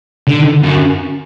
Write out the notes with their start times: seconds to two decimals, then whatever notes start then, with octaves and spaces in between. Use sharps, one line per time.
0.27 D3
0.63 F#2